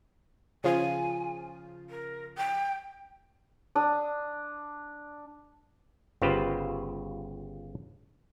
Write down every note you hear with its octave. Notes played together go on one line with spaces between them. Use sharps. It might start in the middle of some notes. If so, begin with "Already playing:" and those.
C#3 F3 F4 G#5
A#4
G5
D4 D#6
G1 C#3 F4 G4 B4 C5